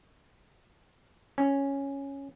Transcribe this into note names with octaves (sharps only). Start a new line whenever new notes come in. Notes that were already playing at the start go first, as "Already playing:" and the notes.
C#4